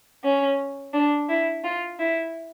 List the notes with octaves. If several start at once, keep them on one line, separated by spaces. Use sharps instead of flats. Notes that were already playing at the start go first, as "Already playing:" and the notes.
C#4
D4
E4
F4
E4